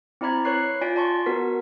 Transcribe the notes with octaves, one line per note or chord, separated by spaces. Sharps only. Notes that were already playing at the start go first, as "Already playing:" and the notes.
C4 E4 D5 A#5 B5 G#6
B4 C#5 C#6 F#6 C7
F4 D5 G#5 B6 D7
D5 A5 C6 C#6
B3 F#4 A#4 B4 B6